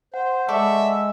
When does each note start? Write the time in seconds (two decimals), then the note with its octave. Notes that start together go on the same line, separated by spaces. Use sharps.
0.14 C5 F#5
0.48 G#3 A4 D5 E5 C#6